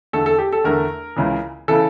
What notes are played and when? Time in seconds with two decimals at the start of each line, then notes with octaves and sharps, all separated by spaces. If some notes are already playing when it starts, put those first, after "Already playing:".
0.13 E2 D3 A3 A4
0.26 A4
0.38 G4
0.53 A4
0.64 E2 D3 A3 A#4
1.16 C#2 C#3 E3
1.68 C#3 E3 A4